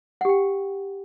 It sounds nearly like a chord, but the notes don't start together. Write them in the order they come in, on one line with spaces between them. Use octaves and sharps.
F#5 G4 G5